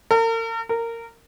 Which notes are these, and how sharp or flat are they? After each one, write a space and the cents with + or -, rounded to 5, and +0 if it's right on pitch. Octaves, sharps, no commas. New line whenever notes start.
A#4 -40
A#4 -15